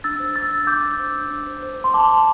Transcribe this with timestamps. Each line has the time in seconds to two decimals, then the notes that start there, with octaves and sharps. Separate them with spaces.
0.04 D4 E6 A6
0.20 C5
0.36 D4 E6 A6
0.51 D4
0.67 D4 D6 G6
0.83 D4
0.99 C5
1.15 D4
1.31 D4
1.47 C5
1.62 C5
1.78 C5
1.84 C6
1.94 C5 A5 D6
2.10 C5